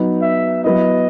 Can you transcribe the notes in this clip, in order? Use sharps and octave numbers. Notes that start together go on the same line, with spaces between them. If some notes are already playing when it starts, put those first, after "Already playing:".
Already playing: F#3 B3 D#4
E5
F#3 B3 E4 D#5